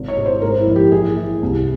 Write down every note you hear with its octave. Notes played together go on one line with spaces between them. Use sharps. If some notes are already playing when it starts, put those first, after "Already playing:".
Already playing: G#1
C#5
G#2
C5
G#2 A#4
E4
A#1
G4
E3 G#4
E3
C2